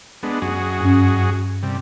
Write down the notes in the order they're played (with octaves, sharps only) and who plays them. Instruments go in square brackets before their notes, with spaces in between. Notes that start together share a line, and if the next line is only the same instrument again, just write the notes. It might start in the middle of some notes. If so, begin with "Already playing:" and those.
[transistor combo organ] G#3 B3 D4
F#2 F#4 G#4
[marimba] G2 C#4
[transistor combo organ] C3 G3